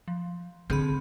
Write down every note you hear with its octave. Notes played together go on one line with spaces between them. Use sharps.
F3
D3 C4 G#4 B5